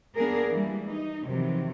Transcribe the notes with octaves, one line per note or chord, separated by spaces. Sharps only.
A#3 B3 D4 G#4 A#4
E3 G3 G#3 A#3
D#4
F2 C3 D#3 E3 F#3